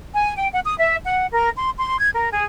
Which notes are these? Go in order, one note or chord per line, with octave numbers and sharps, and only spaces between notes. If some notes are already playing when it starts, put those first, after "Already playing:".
G#5
G5
F#5
D#6
E5
F#5
A#4
C6
C6
G#6
A#4
G#4